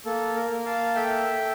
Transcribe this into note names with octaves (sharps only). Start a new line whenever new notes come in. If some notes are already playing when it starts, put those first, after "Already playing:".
A#3 A4
A#4
A#3
F5 A5
A4 E5 G5